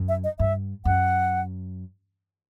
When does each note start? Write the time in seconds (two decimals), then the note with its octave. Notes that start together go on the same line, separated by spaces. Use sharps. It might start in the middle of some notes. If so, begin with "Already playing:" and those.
Already playing: F#2
0.09 E5
0.24 D#5
0.39 G2 E5
0.85 F#2 F#5